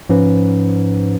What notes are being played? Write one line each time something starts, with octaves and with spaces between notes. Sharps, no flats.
G#2 F3 C#4 B4